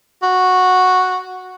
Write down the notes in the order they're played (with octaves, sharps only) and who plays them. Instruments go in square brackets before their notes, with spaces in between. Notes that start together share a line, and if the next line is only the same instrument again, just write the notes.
[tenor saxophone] F#4